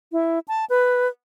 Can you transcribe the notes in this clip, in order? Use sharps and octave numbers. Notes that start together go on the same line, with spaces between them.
E4
A5
B4